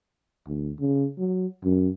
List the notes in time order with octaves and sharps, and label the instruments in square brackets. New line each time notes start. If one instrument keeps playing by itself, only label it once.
[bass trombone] D2
C#3
F#3
F#2